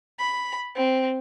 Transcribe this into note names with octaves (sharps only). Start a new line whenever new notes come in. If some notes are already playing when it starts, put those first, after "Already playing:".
B5
C4